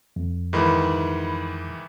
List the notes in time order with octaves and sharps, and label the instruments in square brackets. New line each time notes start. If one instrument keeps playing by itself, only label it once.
[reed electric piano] F2
[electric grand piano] G#2 D#3 E3 [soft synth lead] B5